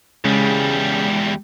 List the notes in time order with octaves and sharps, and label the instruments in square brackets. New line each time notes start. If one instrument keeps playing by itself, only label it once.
[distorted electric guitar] E2 G3 [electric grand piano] C#3 [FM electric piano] G#3